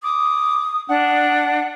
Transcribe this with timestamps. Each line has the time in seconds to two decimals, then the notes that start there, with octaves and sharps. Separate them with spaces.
0.03 D6 D#6
0.89 D4 F#5